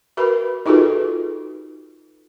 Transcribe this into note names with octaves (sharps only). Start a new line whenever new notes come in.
F#4 A#4 B4 B5
D#4 F4 F#4 G#4 A4 B4